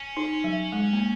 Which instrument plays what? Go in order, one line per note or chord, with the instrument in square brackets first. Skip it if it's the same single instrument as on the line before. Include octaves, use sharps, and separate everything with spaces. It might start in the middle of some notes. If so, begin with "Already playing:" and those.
Already playing: [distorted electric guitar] C#4
[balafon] D#4
F#3
G#3
A#3